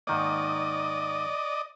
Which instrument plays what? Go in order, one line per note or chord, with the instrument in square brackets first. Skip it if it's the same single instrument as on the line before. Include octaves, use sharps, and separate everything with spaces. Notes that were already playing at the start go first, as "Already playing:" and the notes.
[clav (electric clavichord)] G#2 D#3 A#3 [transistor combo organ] D5 D#5